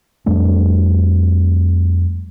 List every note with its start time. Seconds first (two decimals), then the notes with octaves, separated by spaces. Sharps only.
0.26 F2 G3 A3 D4